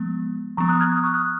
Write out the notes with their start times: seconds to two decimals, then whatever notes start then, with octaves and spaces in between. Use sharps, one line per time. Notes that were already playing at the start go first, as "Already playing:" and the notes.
Already playing: F3 G#3 B3
0.57 F3 B3 A#5 C#6
0.68 D#6 F#6
0.80 F6 G#6
0.92 D#6 F#6
1.03 C#6 F6
1.14 D#6 F#6